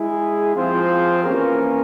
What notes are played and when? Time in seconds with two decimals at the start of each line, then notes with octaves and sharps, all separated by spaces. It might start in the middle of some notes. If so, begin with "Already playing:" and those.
Already playing: G#3 E4 G#4
0.54 F3 C4 F4 G#4 C5
1.24 E3 A#3 C#4 G4 A#4